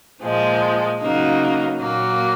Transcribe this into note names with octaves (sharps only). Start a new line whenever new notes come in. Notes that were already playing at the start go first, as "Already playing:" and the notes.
A#2 F3 G#3
C#3 F#3 A#3 D#4
A#2 F#3 A#3